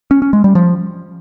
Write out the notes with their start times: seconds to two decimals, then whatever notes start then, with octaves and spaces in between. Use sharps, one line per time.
0.11 C#4
0.22 C#4
0.33 G#3
0.44 G3
0.55 F3